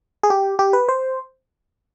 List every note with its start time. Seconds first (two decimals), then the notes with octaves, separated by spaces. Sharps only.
0.23 G#4
0.30 G4
0.59 G4
0.73 B4
0.88 C5